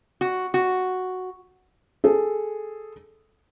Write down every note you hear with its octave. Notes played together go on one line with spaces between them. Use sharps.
F#4
F#4
G#4 A4